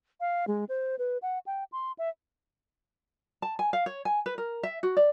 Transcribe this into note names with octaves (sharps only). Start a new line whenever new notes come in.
F5
G#3
C5
B4
F#5
G5
C6
E5
A5
G#5
F5
C#5
G#5
B4
A#4
E5
F#4
D5